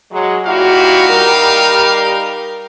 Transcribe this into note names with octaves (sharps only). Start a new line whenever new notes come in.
F#3 G#3
A#2 D#4 E4 F#4 G4 F5
G3 A#4